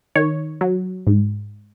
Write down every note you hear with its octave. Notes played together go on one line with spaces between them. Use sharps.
D#3 C#5
F#3
G#2